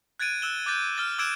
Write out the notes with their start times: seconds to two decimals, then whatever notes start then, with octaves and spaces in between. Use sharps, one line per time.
0.19 F#6 G#6 A6 D7 D#7
0.42 E6 F#6 E7 G7
0.66 D6 F#6 G6 A6
0.97 F6 A6 G7
1.18 D6 E6 F#6 G#6 D7 E7